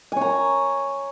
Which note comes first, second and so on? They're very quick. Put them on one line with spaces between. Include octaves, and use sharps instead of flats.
G#5 C#5 A#5